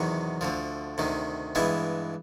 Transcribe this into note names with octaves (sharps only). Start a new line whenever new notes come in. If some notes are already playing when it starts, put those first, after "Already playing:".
Already playing: E2 C3 D#3 F#3
D2 D3 F3
D2 C3 D#3
G2 E3 G#3 B3 E4